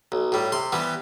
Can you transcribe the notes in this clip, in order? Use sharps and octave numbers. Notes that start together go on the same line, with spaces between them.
B1
A2 G3
C3 C6
E3 G3 B3